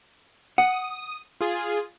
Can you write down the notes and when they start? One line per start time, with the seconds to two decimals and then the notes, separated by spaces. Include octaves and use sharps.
0.58 F#5 D#6
1.41 F4 G#4